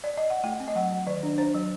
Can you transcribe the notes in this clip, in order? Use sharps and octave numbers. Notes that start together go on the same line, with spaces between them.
D5
D#5
F#5
A3 G5
C4
D#5
F#3 F#5
F#3
D#3 D5
D4
D4 C5
F#3